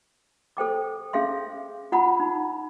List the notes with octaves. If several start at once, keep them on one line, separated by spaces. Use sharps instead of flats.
A4 C5 G5 D6
C#4 G#4 E5 F5 C6
F4 F#5 A#5 B5
D#4